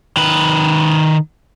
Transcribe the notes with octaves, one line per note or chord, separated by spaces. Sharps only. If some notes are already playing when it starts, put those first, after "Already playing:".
D#3 B4